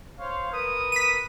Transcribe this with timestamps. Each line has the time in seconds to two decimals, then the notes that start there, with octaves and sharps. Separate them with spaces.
0.19 C5 C#5 F5
0.52 A#4 B4 D#6
0.92 B6 D#7